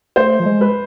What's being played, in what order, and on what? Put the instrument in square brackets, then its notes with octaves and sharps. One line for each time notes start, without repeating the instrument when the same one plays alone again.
[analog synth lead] A3 [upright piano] C5
[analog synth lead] F3
G#3
[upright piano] B4